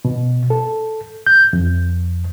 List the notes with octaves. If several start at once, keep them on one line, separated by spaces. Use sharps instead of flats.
B2
A4
G6
F2